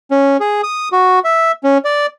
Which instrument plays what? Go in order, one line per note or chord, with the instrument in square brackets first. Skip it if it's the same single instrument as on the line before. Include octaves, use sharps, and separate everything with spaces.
[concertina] C#4
G#4
D#6
F#4
E5
C#4
D5